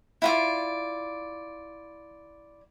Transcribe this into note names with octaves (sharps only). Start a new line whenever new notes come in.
E4 F4 D5